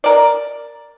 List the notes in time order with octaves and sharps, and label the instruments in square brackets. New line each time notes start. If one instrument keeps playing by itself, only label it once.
[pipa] A#4 D5